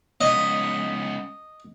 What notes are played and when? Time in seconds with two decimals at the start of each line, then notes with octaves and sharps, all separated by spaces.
0.21 C#2 B3 D#5